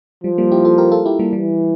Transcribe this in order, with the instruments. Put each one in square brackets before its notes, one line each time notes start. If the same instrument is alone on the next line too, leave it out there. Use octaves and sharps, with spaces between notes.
[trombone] F3 [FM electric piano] G3
[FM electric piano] G3 A#3
E4 G4
F4 A4
G4 A#4
F4 A4
E4 G4
G3 A#3
[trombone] E3 [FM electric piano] G3